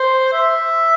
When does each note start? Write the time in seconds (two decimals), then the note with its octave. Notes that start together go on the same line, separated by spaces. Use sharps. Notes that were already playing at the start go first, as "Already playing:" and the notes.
Already playing: C5
0.33 E5